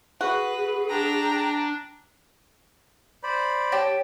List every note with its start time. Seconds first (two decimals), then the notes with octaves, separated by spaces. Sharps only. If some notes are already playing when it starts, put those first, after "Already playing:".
0.21 F#4 G#4 B4
0.89 D4 G5 A#5
3.23 C5 D5 B5
3.72 G4 C#5 A5